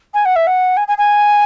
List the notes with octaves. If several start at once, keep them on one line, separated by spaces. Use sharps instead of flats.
G#5
F#5
E5
F#5
G#5
G#5
G#5